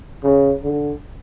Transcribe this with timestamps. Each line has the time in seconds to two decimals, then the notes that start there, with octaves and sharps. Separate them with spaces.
0.23 C#3
0.62 D3